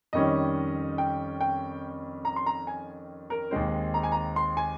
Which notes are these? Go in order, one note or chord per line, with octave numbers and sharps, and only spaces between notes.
F2 D#3 G3 C#4 D#5
G5
G5
A#5
C6
A#5
G#5
A#4
D#2 D#3 G#3 C4 C5
A#5
G#5
A#5
C6
G#5